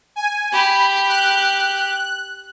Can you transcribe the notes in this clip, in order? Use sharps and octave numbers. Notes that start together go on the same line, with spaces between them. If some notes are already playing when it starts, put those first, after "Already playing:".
G#5
G4 B5
F#6